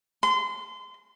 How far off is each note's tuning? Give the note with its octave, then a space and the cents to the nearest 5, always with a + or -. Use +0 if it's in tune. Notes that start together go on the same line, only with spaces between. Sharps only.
C6 -30